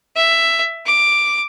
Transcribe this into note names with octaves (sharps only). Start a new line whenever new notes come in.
E5
D6